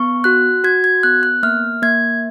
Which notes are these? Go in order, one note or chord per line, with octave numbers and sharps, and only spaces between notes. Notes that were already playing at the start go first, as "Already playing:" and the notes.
Already playing: B3 C#6
F#4 F#6
F#4 G#6
G#6
B3 F#6
F#6
A#3 F6
A#3 G#6